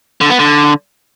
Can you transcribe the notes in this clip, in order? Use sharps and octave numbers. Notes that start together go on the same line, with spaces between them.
D3
B3
D3